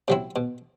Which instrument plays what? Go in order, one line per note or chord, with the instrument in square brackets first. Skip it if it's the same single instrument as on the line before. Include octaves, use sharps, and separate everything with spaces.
[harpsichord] C3 F#3 C4 E4
B2